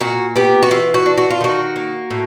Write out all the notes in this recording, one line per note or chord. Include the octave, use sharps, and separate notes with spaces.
A#2 F#4
B3 G4
F#4
E3 F4
F#4
D4
F#4
F4
D#3 F#4
A#3
A2